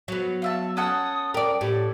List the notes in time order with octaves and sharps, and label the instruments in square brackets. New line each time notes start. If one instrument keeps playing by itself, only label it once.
[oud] F#3 B3
[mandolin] F4 E5 A5
[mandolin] C#4 A4 F#5 [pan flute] D#6
[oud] A#4 D5 [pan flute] G5
[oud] A2 [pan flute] G4